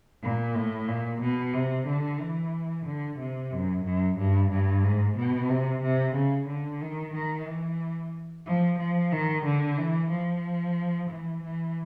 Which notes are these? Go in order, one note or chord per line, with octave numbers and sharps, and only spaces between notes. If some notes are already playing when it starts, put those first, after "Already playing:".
A#2
A2
A#2
B2
C3
D3
E3
D3
C3
F#2
F#2
G2
G2
G#2
B2
C3
C3
C#3
D3
D#3
D#3
E3
F3
F3
D#3
D3
E3
F3
E3
E3